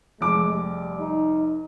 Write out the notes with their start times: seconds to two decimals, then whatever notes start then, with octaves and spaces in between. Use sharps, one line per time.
0.21 F1 G#3 D6
0.53 G3
1.00 D#4